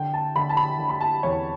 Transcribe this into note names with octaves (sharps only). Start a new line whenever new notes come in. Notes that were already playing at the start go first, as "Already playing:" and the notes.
Already playing: D3 G5
A5
D3 B5
A5
B5
D3
B5
A5
E2 C#5